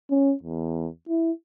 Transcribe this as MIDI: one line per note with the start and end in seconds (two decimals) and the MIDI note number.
0.11 0.34 61
0.43 0.88 40
1.09 1.32 64